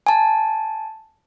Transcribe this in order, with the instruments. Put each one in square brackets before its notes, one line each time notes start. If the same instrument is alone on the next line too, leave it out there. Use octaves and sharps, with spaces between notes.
[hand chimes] G#5 A5